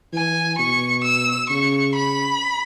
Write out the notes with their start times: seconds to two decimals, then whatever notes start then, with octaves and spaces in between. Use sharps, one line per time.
0.13 E3 G#5
0.58 B2 C#6
1.04 E6
1.50 C#3 C#6
1.95 B5